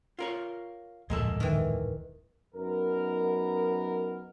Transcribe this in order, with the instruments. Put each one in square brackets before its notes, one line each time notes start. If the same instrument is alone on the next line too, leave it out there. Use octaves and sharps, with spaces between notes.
[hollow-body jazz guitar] F4 A#4 C#5
[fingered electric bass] D1 F2 A#2 [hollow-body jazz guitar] G#3 A#3 A4
[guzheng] D#3 E3
[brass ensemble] F#2 B3 D#4 A#4